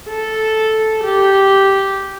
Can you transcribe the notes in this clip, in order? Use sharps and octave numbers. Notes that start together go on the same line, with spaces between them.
A4
G4